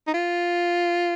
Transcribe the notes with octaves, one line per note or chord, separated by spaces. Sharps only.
D#4
F4